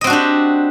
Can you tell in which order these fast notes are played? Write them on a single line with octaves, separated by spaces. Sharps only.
D#5 C4 F#4 D4 G4